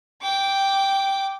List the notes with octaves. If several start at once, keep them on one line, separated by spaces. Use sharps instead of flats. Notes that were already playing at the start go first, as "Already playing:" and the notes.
G5 D6